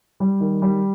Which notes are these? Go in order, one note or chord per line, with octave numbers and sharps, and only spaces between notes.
G3
D#3
G3